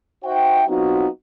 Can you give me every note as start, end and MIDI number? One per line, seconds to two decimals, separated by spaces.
0.24 0.63 63
0.24 0.63 66
0.24 0.63 72
0.24 0.63 76
0.24 0.63 79
0.67 1.07 54
0.67 1.07 59
0.67 1.07 60
0.67 1.07 63
0.67 1.07 65
0.67 1.07 66